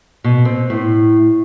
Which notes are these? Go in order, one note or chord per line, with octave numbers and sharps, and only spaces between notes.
B2
C4
A2